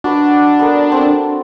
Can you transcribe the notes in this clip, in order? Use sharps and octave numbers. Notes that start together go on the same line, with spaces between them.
D4 F#4 B4 D#5
B3 A4 A#4
C4 A4